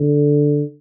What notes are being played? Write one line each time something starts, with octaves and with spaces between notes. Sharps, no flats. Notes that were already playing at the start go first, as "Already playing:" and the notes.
Already playing: D3